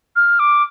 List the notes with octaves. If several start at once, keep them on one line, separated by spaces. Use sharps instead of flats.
F6
D6